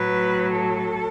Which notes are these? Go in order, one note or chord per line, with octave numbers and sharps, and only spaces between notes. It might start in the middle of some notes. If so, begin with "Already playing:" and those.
Already playing: A2 F#3 B4
A4